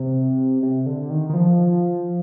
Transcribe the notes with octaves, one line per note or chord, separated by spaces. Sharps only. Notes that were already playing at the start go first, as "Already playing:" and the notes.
Already playing: C3
C3
D3
D#3
D#3
F3